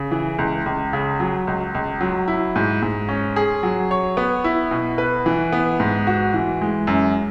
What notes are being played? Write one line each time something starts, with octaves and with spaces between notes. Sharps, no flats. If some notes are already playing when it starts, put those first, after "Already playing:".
Already playing: C#3
E3
C#2
C#2
C#3
F#3
C#2
C#2
F#3
E4
G#2
G#2
C#4
G#4
F#3
C#5
B3
E4
B2
B4
E3
B3
G#2
F#4
E3
G#3
F#2